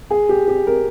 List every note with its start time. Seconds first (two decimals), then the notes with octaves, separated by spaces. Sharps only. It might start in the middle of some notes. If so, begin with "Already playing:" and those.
0.11 G#4
0.29 G4
0.48 G4
0.67 A#4